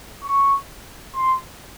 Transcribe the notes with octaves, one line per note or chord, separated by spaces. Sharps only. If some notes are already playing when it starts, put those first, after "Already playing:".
C#6
C6